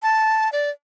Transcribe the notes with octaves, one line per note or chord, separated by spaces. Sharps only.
A5
D5